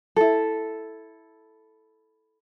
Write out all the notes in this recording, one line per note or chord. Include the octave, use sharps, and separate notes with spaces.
E4 A4